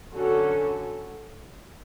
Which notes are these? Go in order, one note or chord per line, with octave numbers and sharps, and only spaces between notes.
D3 F#3 C#4 F#4 A4